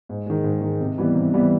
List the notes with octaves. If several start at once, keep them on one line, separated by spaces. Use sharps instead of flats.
G#2
D#3 G#3
G#2
D#3 G#3
C3
E3 G3 B3
C3
E3 G3 B3